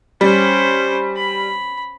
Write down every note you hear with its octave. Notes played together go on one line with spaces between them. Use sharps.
G3 C#4 C5
B5